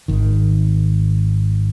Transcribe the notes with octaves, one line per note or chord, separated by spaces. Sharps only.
G#1 D#3